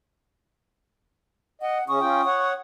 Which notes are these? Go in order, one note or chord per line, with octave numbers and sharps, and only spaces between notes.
D#5 F#5
C#3 C#4 C#6 D#6
C#4 F4 G5
C#5 F#5